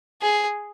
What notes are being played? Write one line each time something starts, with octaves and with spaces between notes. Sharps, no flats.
G#4